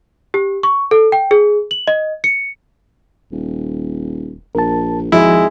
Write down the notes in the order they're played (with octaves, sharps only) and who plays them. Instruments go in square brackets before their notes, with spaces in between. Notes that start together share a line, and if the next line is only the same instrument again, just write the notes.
[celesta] G4
C#6
A4
G5
G#4
F#7
D#5
C#7
[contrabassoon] D#1
[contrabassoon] A#1 [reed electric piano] A#4 A5
[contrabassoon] G#1 [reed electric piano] F3 F#4 [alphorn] G#3 [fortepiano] E4